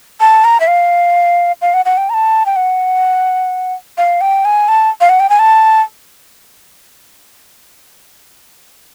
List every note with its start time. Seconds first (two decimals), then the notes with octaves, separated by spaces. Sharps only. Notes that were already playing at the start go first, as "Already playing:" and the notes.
0.20 A5
0.44 A#5
0.60 E5
0.67 F5
1.62 F5
1.74 F#5
1.85 F#5
1.97 G5
2.10 A#5
2.14 A5
2.46 G5
2.56 F#5
3.98 F5
4.21 G5
4.45 G#5
4.68 A5
5.01 F5
5.09 F#5
5.20 G5
5.30 G#5
5.39 A5